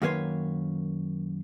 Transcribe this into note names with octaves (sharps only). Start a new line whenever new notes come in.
F#2 D#3 A#3 B4 C#5 C6